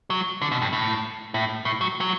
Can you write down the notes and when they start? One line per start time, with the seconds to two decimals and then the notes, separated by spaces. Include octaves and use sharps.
0.10 F#3
0.42 D3
0.52 B2
0.62 G2
0.73 A2
1.34 A2
1.65 A2
1.81 F#3
2.01 F#3